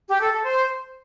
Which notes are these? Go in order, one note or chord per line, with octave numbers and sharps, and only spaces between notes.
G4
A4
A4
C5